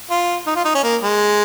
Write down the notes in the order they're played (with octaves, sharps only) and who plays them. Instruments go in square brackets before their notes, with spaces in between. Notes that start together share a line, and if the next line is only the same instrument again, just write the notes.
[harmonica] F4
D#4
F4
D#4
C#4
A#3
G#3